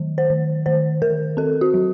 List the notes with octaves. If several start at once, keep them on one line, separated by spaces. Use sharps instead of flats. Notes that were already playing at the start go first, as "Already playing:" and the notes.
Already playing: D#3 F#3
C5
D#3
D#3 C5
D#3 A#4
C4 A4
F#4
F#3